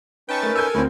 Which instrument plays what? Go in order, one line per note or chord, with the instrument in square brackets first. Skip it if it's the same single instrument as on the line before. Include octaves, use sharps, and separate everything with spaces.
[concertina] C#4 D#4 B4 [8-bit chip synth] G5 A5 C#6
[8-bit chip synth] A3 A6 [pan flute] A#4
[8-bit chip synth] A4 G#5 [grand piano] E6 G6
[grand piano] D2 C4 [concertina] C#4 E4